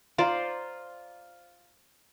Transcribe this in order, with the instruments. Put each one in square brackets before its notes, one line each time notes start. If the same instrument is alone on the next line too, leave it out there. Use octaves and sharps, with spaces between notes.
[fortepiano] F4 A#5 [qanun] C5 D5